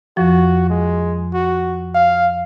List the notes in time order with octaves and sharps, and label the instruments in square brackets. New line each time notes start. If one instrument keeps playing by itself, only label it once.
[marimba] F2 F3 [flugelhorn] F#4
[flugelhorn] G#3
F#4
F5